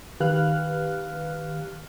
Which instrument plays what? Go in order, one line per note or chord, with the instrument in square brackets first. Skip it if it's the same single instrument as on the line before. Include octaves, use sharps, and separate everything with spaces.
[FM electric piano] D#3 G4 B4 F5 F6 F#6